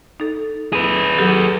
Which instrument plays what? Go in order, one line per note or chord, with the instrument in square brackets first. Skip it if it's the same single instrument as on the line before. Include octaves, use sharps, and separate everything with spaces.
[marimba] D#4 A4
[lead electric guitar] G#4 B4
[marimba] F#3 G4 A4